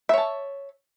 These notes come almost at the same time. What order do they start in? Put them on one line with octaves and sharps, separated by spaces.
E5 C#5 A5